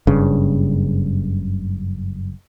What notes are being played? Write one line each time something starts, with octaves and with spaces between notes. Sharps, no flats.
F#1 G2 C#3